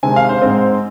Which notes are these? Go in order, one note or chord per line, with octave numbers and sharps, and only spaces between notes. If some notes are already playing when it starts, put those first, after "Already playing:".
C3 D#3 G#3 C4 G#5
F5
C5
G#2 G#3 C4